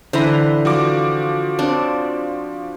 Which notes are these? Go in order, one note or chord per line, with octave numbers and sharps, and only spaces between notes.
D3 E3 C5 A#5 B5
F3 F#4 D6
C4 D4